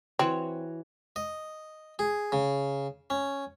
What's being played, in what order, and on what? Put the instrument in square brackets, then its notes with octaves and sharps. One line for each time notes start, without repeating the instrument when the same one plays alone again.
[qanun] E3 F#4 C#5 [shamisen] C4
[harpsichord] D#5
G#4
C#3
C#4